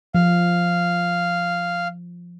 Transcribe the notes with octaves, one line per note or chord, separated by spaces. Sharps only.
F3 F5